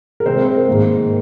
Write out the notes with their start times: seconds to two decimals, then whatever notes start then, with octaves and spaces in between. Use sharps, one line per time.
0.20 A#4
0.26 C3 G#3 C4 C5
0.37 A#4
0.47 C5
0.57 A#4
0.68 G#2 D#3 A#3